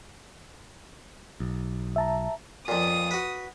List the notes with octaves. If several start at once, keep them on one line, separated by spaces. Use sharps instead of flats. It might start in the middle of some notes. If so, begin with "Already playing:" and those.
B1
E5 A5 A#5
F2 A#2 D#6
F#4 B4